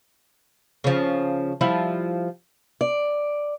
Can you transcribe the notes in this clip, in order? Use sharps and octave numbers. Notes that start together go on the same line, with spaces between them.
C#3 F3
F3 G3 E4
D5